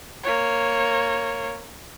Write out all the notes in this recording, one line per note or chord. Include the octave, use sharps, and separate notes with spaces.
A#3 C#5